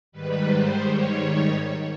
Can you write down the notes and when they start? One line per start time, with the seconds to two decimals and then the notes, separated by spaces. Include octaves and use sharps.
0.12 G#2 D#3 G3 B4
0.46 C5
0.81 C#5